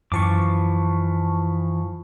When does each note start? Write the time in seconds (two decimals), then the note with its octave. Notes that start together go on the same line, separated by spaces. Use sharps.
0.12 F#2 E3 F3 A5 C#6 D6